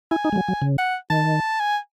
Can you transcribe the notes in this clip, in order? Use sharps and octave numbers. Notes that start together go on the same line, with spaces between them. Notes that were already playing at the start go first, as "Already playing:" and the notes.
E4 G#5
D#4
G#3
F#3
F#3
C#3
F#5
D#3 A5
G#5